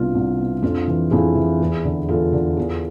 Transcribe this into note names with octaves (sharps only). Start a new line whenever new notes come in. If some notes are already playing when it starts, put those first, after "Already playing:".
Already playing: C2 B2 D4 F4
C2
B2
F2 D4 F4
E3
F2 E4 G#4
E3
E2
D3
E2 F4 A4
D3
E2